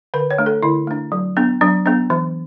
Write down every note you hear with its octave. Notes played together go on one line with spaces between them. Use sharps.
D3 B4
C#5
A3 D4
A4
D3 E4
A3 D4
F#3
B3 D4
F#3 D4
B3 D4
E3